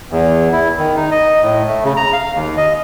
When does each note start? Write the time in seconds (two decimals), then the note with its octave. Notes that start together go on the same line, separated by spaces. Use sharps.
0.11 E2
0.53 E4
0.78 D#3
0.96 D#4
1.11 D#5
1.42 A2
1.68 A3
1.84 C#3
1.97 A#5
2.13 F5
2.35 D#2
2.57 D#5